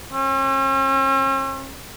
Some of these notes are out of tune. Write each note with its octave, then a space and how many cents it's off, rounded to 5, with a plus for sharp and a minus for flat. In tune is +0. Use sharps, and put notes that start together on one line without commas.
C#4 -45